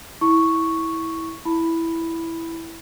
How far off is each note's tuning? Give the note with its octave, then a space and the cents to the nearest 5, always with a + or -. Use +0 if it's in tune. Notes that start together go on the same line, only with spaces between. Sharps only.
E4 -15 C#6 +0
E4 +0 B5 +0